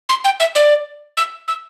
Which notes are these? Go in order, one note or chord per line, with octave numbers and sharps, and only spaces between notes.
C6
G5
E5
D5
E6
E6